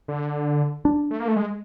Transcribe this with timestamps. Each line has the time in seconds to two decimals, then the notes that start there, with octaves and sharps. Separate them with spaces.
0.08 D3
0.85 D4
1.11 A3
1.20 A#3
1.28 A3
1.36 G#3